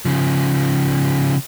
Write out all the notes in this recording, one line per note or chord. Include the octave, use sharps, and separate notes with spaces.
C#3 F3